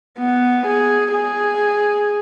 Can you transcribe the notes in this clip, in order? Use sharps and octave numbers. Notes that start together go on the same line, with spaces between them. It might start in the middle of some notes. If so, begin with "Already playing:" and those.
B3
G#4
G#4